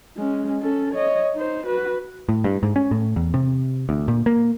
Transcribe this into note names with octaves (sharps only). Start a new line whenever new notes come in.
G#3 C#4
C#4 A4
C#5 D#5
D#4 C5
F#4 B4
A2
G2
G#2
C#4
A2
E2
C3
D2
A#2
A#3